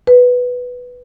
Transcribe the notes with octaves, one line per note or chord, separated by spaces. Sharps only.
B4